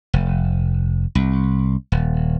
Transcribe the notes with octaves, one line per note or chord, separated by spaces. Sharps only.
F1
C2
D#1